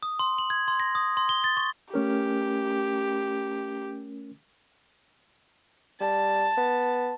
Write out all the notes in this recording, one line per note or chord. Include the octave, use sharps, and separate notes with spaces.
D#6
C6
F#7
G#6
C6
A#6
D#6
C6
G7
A6
C#6
A3 C#4 G4 A#4
G3 A5
B3